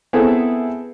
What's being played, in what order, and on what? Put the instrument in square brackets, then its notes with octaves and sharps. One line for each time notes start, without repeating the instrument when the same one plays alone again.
[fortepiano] B3 C4 E4 G#4 A4 E5